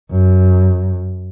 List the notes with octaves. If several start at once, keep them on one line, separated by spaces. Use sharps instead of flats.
F#2